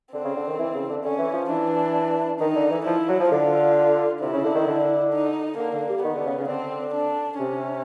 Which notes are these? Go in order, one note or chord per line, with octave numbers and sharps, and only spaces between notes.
D3 C4
C#3
D3
D#3
E3
C#3
D3
D3 C#4
E3
F3
E3 D4
D#3 D#4
D3
E3
F3 E4
F#3
F3
D3 F4
C3 E4
C#3
D3
D#3
D3
D#4
D3 A#3
D3
G3
D#3 B3
D3
C#3
C#3
D3 C4
D4
C3 C#4